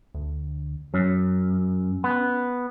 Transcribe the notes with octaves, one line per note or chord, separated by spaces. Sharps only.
D2
F#2 C#4
B3